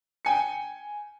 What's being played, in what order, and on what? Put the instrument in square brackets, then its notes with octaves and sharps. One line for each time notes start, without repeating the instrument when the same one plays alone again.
[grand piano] G5 G#5 C#7